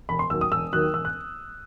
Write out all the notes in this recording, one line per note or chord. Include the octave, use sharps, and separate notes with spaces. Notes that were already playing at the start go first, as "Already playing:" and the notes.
E1 B5
C6
D#2 D#3 F#3 E6
D#6
E1 E6
D#2 D#3 F#3 F#6
E1 E6
F#6